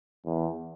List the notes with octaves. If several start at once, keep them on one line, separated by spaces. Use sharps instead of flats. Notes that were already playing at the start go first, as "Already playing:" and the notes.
E2